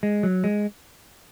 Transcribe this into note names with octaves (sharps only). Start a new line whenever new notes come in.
G#3
F#3
G#3